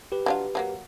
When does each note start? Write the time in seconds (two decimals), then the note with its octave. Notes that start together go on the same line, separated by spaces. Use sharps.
0.12 G4 B4
0.26 F#3 D4 F4
0.55 F3 F#3 A#3